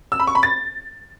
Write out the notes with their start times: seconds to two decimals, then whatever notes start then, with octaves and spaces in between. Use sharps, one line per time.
0.12 E6
0.20 B5
0.27 C#6
0.35 B5
0.43 A6